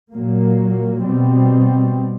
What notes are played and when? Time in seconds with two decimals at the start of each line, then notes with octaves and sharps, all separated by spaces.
0.12 A#2 F#3 A#3
1.05 B2 G3 C4